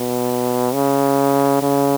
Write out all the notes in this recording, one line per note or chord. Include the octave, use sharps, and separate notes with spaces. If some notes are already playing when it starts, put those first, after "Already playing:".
Already playing: B2
C#3
C#3